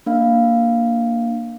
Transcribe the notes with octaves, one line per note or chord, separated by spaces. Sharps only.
A#3 D4 F5